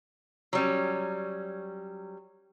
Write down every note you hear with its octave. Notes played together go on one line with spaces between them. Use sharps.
F#3 G3 C#4